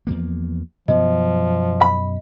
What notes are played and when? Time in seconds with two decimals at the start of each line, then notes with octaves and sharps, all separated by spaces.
0.07 E2 F3 A#3
0.88 F#2 B2 F3 B3 D#5
1.82 B5